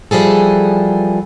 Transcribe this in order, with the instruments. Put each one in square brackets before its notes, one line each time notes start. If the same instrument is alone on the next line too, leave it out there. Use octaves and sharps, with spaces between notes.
[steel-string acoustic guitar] E3 F3 G3 G#4 A4